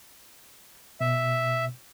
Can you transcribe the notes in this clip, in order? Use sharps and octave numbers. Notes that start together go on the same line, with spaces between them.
B2 E5